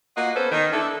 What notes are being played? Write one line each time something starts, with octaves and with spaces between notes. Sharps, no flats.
A#3 F4 F#4 D#5 F#5
B3 C#4 A4 B4 C5
D#3
D4 E4 A4